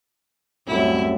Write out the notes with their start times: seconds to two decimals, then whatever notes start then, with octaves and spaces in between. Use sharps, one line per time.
0.67 C2 F#2 A2 E4